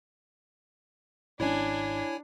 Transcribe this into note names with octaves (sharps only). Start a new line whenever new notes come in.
G#1 C#4 D4 E4 C#5 G#5